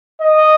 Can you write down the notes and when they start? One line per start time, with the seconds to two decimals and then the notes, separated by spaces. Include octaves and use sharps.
0.21 D#5